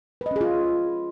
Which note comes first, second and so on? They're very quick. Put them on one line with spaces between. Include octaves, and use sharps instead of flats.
B4 D#5 C#4 G#4 F4